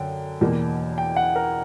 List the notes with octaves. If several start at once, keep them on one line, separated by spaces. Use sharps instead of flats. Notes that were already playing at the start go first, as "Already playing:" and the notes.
Already playing: F#2 D3 G5
E2 B2 A#3
G5
F#5
A#4